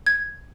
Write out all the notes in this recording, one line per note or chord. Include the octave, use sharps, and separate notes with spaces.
G#6